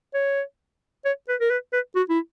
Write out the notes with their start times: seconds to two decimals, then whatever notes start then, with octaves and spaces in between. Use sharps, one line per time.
0.14 C#5
1.05 C#5
1.28 B4
1.40 A#4
1.50 B4
1.73 B4
1.96 F#4
2.09 E4